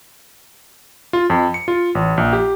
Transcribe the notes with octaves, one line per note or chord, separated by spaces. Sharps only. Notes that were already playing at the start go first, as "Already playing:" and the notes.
F4
F2
C#7
F4
A1
A#1
G4